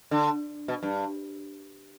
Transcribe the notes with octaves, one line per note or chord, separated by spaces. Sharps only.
D3
B2
G2